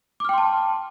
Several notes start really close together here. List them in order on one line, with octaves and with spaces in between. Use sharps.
D6 F6 G5 C6 A5